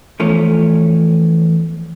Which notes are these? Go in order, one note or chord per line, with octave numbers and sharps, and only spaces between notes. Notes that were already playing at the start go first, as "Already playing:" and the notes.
E2 F3 A3 C#4